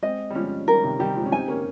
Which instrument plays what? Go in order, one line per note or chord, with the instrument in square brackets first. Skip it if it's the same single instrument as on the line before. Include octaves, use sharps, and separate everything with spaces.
[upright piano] G#3 C4 [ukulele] D#5
[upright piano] G3
[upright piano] F3 G#3 [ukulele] C#4
[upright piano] D#3 G3 [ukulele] A#4
[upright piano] C3 D#3
[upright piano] D#3 G3 [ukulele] G4
[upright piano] F3 G#3
C#4
[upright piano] C4 D#4 [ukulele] G#5
[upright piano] A#3 C#4